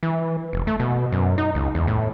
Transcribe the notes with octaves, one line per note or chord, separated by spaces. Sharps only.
E3
F1
A3
B2
F#2
D#4
C#2
E2
A2